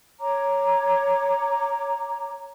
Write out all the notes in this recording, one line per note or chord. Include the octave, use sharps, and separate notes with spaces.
C#5 A#5 D6